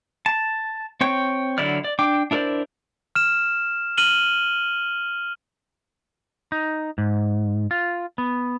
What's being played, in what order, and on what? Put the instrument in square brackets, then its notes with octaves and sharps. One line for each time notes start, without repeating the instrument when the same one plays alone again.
[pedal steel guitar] A5
C4 C#5 G5
D3 F#3 E4 D5 F6
D5
D4 G5 D6
D4 E4 A#4 C5 D5
[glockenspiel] F6 E7
F6 D#7 F#7 G7
[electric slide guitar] D#4
G#2
F4
B3